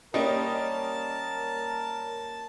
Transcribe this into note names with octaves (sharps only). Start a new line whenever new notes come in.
G3 A#3 C#4 A#4 D#5 A5